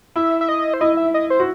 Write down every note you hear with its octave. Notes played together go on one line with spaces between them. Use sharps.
E4 E5
E5
D#5
C5
E4 D#5
E5
D#5
C5
F#4